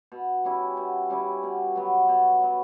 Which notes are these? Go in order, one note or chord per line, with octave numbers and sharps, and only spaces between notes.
B2
G3 C#4 E4
B2
G3 C#4 E4
B2
F#3 B3
B2
F#3 B3